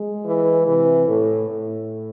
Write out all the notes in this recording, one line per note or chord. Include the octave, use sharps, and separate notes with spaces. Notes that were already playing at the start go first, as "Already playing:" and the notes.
Already playing: G#3
E3
C3 E3
A2
A2